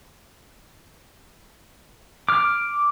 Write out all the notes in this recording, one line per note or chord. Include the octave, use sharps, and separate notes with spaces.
D6 F6